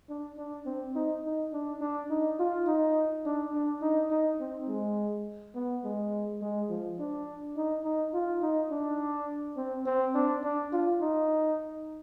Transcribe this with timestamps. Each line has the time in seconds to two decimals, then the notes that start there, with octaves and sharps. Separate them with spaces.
0.09 D4
0.37 D4
0.66 C4
0.95 D#4
1.24 D#4
1.53 D4
1.81 D4
2.10 D#4
2.39 F4
2.67 D#4
3.26 D4
3.54 D4
3.82 D#4
4.11 D#4
4.40 C4
4.68 G#3
5.55 B3
5.84 G#3
6.42 G#3
6.69 F3
6.99 D4
7.57 D#4
7.84 D#4
8.13 F4
8.42 D#4
8.71 D4
9.57 C4
9.86 C4
10.15 D4
10.44 D4
10.73 F4
11.01 D#4